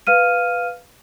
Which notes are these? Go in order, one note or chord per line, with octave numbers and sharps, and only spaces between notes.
B4 F5 F6 D#7